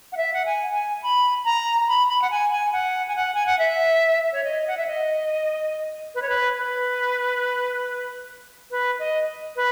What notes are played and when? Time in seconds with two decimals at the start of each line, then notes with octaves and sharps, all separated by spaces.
0.12 F#5
0.17 E5
0.33 F#5
0.46 G#5
0.74 G#5
1.02 B5
1.45 A#5
1.88 B5
2.09 B5
2.22 F#5
2.31 G#5
2.52 G#5
2.73 F#5
3.08 G#5
3.16 F#5
3.34 G#5
3.46 F#5
3.59 E5
4.33 C#5
4.44 D#5
4.67 F#5
4.77 E5
4.87 D#5
6.15 B4
6.22 C#5
6.29 B4
6.57 B4
8.71 B4
8.99 D#5
9.56 B4